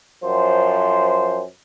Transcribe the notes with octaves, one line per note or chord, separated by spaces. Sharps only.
F#2 F3 C5